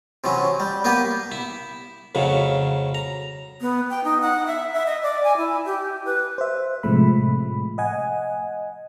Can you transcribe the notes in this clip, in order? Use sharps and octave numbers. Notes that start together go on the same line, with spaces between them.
C3 E3 F#3 C#4
G3
A#3 B3 G4 B4
E4
F2 A2 C#3 F#3
A#5
B3
G5
D#4
F#5
E5
E5
D#5
D5
G#5
E4
G4
B4
C5 E5
A2 C3 F3 G#3 A3 B5
D#5 F#5 G#5